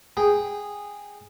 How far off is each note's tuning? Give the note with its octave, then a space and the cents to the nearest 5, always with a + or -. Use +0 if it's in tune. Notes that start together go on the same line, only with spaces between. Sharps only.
G#4 -10 G5 -5